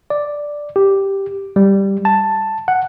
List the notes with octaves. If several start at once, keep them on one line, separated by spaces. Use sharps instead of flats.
D5
G4
G3
A5
F#5